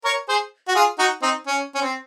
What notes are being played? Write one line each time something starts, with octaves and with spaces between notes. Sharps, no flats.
A#4 C#5
G#4 C5
F#4
F4 G#4
D#4 F#4
C4 D#4
C#4
C#4
C4